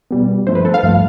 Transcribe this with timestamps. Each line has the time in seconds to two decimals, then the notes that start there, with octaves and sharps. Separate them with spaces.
0.11 B2 G3 B3
0.47 G2 F3 A3 C5
0.55 B4
0.65 A4
0.74 F5
0.83 G2 F3 A3